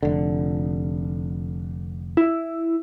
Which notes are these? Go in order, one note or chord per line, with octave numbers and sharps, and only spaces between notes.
F1 D3
E4